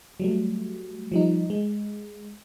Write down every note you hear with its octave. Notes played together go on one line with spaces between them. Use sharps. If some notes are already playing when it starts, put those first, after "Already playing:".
F#3 G3 A3
F3 G3 D#4
G#3